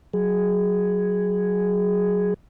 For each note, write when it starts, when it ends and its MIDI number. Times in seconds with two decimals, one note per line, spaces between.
0.14 2.34 54
0.14 2.34 68